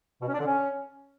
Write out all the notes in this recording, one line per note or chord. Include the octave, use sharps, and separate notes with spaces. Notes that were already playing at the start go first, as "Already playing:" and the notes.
B2
C#4
D4
D3
C#4